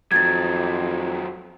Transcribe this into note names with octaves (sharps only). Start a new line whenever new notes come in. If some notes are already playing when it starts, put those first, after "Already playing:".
F2 D#3 F#3 G#6 A6